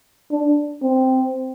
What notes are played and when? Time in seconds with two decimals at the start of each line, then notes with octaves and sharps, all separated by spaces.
0.32 D4
0.82 C4